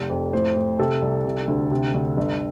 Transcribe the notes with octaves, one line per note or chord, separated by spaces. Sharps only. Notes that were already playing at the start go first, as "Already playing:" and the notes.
Already playing: F1
F2
A2 C5
A2
C3 A4
C2
C3
D2
C3
D2
G1